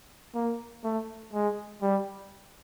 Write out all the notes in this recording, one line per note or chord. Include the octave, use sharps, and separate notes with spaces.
A#3
A3
G#3
G3